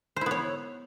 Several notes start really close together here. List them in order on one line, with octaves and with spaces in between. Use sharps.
C5 E4 B3 C#5